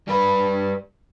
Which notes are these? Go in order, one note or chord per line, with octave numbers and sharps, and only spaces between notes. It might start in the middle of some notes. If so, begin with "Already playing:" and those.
G3 B4